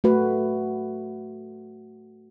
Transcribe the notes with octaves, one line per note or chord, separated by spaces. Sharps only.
A3 F#4 B4